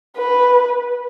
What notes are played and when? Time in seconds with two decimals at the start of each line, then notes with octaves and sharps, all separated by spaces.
0.16 B4